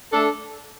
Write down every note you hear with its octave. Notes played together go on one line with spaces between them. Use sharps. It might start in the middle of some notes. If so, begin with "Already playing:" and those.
A3 D4 A4